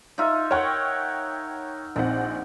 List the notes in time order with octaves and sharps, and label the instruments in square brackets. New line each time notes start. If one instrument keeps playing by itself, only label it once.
[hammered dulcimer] D#4 F4 E5
[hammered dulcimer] A#4 F#5 [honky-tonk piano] C#5 G5 C#6
[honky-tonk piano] A#1 C4 F#5 [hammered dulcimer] D#4